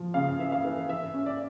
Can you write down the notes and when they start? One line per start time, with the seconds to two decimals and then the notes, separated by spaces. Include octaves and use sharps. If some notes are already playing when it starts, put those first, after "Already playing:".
Already playing: F3
0.14 C#3 F5
0.39 E3 E5
0.52 F5
0.65 E3
0.88 E3 E5
1.14 C#4
1.26 D5